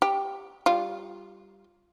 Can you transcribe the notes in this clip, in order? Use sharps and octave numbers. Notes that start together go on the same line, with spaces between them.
G4
G3 F4